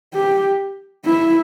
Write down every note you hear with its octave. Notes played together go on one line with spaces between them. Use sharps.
G4
E4